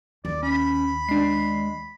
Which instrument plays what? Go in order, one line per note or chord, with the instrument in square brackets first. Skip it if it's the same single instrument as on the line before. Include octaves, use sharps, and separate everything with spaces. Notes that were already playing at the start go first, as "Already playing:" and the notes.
[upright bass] D#2 [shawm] D5
[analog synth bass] C#4 [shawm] B5
[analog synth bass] G#3 [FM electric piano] D4 C7